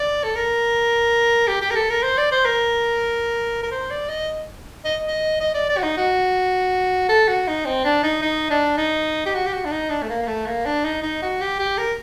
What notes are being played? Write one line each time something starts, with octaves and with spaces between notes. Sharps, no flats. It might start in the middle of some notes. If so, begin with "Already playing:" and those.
Already playing: D5
A4
A#4
G4
G4
A#4
A4
A#4
C5
D5
C5
A#4
A#4
C5
D5
D#5
D#5
D#5
D#5
D5
D5
F#4
D#4
F#4
A4
F#4
D#4
C4
D4
D#4
D#4
D4
D#4
G4
F#4
G4
F#4
D4
D#4
D4
A3
A#3
A#3
A3
A#3
D4
D#4
D#4
F#4
G4
G4
A#4